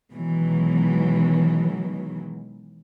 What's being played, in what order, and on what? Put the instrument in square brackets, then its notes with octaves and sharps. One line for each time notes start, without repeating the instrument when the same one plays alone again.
[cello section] B2 D#3 E3 F#3 G#3